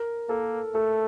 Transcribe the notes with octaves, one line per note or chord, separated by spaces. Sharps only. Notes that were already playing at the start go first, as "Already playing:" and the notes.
Already playing: A#4
A#3 A4
A3 A4